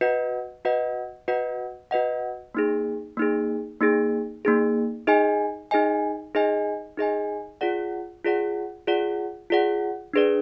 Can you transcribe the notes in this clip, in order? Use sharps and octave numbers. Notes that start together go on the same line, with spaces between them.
F#4 B4 D#5 F#5
F#4 B4 D#5 F#5
F#4 B4 D#5 F#5
F#4 B4 D#5 F#5
A#3 D#4 G#4
A#3 D#4 G#4
A#3 D#4 G#4
A#3 D#4 G#4
D#4 G#4 D#5 G#5
D#4 G#4 D#5 G#5
D#4 G#4 D#5 G#5
D#4 G#4 D#5 G#5
F4 G#4 D5 F#5
F4 G#4 D5 F#5
F4 G#4 D5 F#5
F4 G#4 D5 F#5
D4 G#4 B4 D5